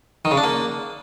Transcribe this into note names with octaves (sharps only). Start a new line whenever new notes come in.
D#3
C#3
D4
A#3